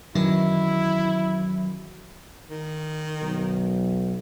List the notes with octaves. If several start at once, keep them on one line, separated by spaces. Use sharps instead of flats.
F#2 D#3 E3 F#3 E4
D#3
B1